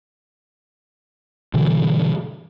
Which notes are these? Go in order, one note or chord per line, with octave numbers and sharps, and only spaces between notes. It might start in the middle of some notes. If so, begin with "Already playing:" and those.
G2 B2 D3 E3